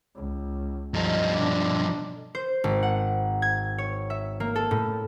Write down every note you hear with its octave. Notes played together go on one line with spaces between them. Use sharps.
C#2
G2 F3 D#4 A4 C#5
B2 D4
C5
G#1
F#5
G#6
C#5
E5
A#3
A4
A2